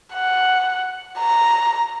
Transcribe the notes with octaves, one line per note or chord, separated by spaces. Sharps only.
F#5
A#5